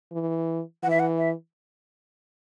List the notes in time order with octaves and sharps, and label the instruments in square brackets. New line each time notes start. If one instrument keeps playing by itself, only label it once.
[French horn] E3
[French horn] E3 [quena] F#5
[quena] E5
F#5
E5